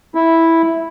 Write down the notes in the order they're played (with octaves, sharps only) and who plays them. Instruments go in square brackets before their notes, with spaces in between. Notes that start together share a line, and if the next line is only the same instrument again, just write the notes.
[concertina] E4